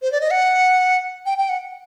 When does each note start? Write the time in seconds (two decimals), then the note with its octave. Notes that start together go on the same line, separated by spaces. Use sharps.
0.02 C5
0.12 D5
0.21 D#5
0.31 F#5
1.26 G5
1.38 G5
1.49 F#5